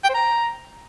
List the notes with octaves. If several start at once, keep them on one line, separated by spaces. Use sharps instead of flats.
G5
C5
A#5